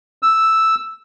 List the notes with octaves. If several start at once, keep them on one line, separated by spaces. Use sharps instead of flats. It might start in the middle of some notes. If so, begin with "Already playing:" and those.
E6